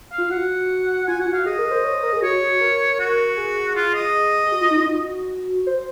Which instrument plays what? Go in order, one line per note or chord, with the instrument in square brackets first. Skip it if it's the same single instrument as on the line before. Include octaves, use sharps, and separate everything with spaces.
[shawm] F5
[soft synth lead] F4
[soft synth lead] F#4 [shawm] F#5
[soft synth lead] F4 [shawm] G#5
[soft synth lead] F#4 [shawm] F#5
[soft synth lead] F#4 [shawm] F5
[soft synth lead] G#4 [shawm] D#5
[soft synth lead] A#4
C5
C#5
C5
A#4
G#4
[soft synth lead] F#4 [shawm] C#5
[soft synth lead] A#4
[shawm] F#4
[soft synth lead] G#4
[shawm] F4
D#5
[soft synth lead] G#4
F#4
F4
D#4
F4
F#4
C5